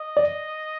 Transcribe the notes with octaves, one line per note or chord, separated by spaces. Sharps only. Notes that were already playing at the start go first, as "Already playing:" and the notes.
Already playing: D#5
D5